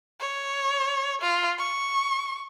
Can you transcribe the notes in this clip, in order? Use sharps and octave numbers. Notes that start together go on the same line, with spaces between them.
C#5
F4
C#6